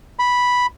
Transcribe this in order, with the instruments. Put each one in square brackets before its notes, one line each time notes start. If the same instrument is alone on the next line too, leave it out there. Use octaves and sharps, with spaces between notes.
[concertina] B5